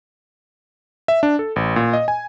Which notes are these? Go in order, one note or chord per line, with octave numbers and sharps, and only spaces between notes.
E5
D4
A4
A1
A#2
D#5
G#5